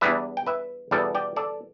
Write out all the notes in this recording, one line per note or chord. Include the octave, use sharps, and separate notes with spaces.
E2 E3 G3 B3 D4 B4 E5
G5
B4 E5
E2 B2 G3 A4 D5
D5 G5
A4 D5